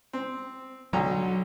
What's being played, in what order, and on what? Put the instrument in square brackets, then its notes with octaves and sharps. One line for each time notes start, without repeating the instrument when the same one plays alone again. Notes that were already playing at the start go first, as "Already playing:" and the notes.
[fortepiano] C4
[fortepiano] B1 D3 A#5 [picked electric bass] F#3